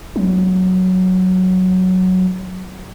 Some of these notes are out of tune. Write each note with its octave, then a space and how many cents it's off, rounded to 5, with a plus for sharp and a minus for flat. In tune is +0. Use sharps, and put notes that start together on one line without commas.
F#3 +0